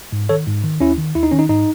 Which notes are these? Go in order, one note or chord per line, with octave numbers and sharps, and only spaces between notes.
G#2
D#3 A4 C#5
G#2
D#3
D#2 C#4 E4
D#3
D#2 E4
D#4
D#3 C#4
D#4
G#2 D#4